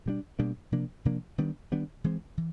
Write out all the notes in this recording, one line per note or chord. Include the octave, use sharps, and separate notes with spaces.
B2 G3 A#3 D4
B2 G3 A#3 D4
C3 F3 A#3 D4
C3 F3 A#3 D4
D#3 G3 B3 D4
D#3 G3 B3 D4
E3 G#3 C4
E3